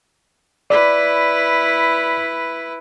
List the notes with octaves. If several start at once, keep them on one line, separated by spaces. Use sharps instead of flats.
E4 B4 D5